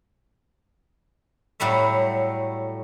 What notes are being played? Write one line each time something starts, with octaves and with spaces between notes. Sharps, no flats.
A2 F#3 G3 A3 E5